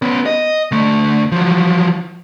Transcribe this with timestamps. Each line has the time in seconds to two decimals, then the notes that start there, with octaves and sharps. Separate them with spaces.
0.02 B3 C#4
0.26 D#5
0.71 D2 A3
1.32 F3 F#3